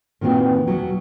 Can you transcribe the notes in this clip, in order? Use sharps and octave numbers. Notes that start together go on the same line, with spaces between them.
A#2 D#3 E3 B3 C4 F#4
E2 B2 F#3